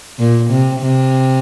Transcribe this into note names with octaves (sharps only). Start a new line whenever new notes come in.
A#2
C3
C3